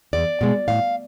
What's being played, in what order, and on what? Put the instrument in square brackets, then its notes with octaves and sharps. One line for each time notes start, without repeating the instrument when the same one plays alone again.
[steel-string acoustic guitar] E2 D5
B2 G#3
A2 F5